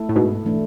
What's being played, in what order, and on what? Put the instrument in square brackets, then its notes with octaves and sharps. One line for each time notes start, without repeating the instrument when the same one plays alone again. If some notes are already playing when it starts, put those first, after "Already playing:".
Already playing: [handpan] A3 E4 A4
[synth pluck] A2
G#2 B2
[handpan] E3 A3 D4